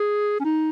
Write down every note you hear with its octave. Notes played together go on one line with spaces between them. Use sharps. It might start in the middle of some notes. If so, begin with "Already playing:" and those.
Already playing: G#4
C#4
D#4